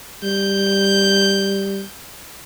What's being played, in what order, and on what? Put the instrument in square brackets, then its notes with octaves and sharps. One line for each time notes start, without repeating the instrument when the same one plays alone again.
[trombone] G3 [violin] G6